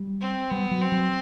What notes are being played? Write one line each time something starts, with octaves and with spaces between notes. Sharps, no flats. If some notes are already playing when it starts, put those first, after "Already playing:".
Already playing: G3
C4
G3 B3
F#3
C4
F#3